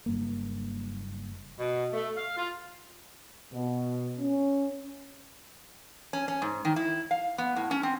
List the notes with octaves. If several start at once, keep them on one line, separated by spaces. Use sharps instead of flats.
F#1 G2 A#3
B2
A3
F5
F4
B2
C#4
C#4
C#4
G#2
D#3
E4
F5
B3
A2
C#4
C4